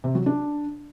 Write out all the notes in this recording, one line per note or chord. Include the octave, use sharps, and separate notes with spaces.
C3
F#3
D4